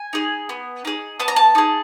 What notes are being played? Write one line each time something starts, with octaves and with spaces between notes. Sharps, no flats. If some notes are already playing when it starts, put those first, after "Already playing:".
Already playing: G#5
D#4 G#4
B3
D#4 G#4
B3 A5
A#5
A5
D#4 G#4